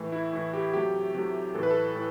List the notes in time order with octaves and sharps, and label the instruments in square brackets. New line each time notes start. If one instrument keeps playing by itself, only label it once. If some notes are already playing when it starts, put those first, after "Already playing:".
Already playing: [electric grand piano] A2 E3 A3
E4
A2 E3 A3
G4
C3 F#3 A3 G4
C3 F#3 A3
A2 E3 A3 A4
B4
A4
A2